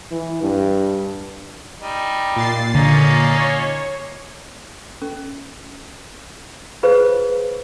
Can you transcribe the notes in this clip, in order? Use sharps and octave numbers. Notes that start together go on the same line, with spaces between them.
E3
G2
G3 D#4
A#2 A6 C7
D3 A#3 C#4 D#4
C#5
C#4
F4 G#4 B4 C5 F5